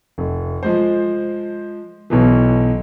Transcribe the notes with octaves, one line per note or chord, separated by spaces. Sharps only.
F1
F3 G#3 C5
B1 B2 E3